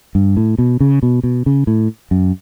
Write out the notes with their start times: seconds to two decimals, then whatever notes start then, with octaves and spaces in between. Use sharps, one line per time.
0.15 G2
0.37 A2
0.58 B2
0.80 C#3
1.03 B2
1.23 B2
1.46 C#3
1.67 A2
2.11 F#2